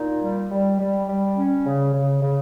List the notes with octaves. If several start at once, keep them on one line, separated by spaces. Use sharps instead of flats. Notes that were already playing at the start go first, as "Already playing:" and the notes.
Already playing: A#2 D#4
G3
G3
G3
G3
C#4
C#3
C#3
C#3